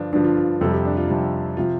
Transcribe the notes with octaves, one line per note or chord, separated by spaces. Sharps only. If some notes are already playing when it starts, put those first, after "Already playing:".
Already playing: G2 D3 F3 D4 F4
G2 D3 F3 D4
F4
F4
F2 C3 G3 A4
G4
D4
F4
F2 C3 G3
C3 F3 F4